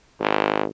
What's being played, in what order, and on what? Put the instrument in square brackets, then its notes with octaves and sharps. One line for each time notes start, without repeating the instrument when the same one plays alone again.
[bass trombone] G#1